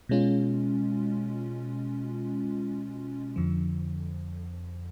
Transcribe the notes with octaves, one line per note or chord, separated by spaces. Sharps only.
B2 G#3 C#4 F4
F2 D3 F3